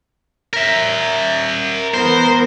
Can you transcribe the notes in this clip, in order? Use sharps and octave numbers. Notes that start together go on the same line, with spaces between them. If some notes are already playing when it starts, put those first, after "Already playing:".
A#4 E5
E3 B3 A#4 C5